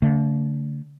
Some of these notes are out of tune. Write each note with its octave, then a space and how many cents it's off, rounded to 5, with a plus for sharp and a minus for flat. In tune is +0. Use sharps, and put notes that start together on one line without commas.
D3 -35 A3 +25